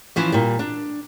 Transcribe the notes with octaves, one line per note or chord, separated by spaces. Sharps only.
E3 F3 C#4
A#2 G3
D4